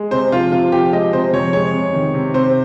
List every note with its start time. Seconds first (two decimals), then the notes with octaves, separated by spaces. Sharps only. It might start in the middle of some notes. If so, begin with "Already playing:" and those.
Already playing: G#3
0.11 C3 C5
0.32 F3 F4
0.52 C3 F4
0.72 F3 G4
0.93 G#3 D#5
1.13 C3 C5
1.33 F2 C#5
1.53 G#3 C#5
1.73 C3
1.93 D#3
2.14 C3
2.34 C3 C5